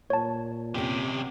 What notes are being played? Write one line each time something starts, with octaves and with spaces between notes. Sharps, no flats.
A#2 C#5 A5
C3 B3 C#4 G4